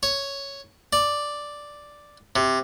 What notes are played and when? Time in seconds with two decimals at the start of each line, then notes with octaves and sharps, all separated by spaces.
0.03 C#5
0.93 D5
2.36 C3